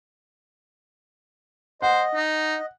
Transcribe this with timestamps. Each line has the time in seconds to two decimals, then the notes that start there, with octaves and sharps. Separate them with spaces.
1.82 C5 D#5 F#5
2.15 D#4